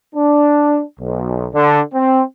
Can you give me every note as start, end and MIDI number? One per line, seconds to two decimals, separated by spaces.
0.15 0.82 62
0.99 1.46 35
1.53 1.79 50
1.93 2.20 60